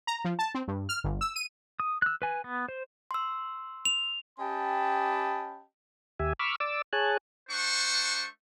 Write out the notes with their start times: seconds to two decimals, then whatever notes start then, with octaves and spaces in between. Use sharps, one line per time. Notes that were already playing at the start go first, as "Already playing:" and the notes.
0.07 A#5
0.25 F3
0.39 A5
0.55 C4
0.68 G2
0.89 F6
1.04 G1
1.21 E6
1.36 D#7
1.80 D#6
2.02 E6 F#6
2.22 B4 G#5
2.44 B3
2.68 C5
3.11 C6 E6
3.85 F7
4.39 C#4 G4 D#5 G5 A5 B5
6.20 D#2 G4 E5 G#5
6.39 B5 C#6 D6 E6 F6
6.60 D5 D6 E6
6.93 G#4 C#5 G#5 A5 F#6
7.50 A3 D4 C5 F#5 C#6